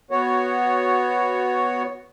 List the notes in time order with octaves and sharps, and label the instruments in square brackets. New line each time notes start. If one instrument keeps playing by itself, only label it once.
[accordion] B3 F#4 C#5